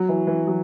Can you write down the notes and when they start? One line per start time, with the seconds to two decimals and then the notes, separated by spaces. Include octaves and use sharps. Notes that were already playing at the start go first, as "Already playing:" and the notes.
Already playing: F#3
0.09 E3
0.27 E3
0.47 F#3